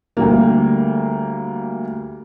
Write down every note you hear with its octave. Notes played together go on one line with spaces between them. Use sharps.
D2 G3 A#3